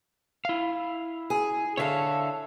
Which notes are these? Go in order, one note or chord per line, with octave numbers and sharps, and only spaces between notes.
E4 F5
G#4
D3 A4 C#5 E5 F5